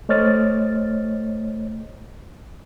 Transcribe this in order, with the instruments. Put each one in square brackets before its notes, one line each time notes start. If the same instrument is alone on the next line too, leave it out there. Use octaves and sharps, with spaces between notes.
[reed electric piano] A3 C5 C#5 D#5 F6 A6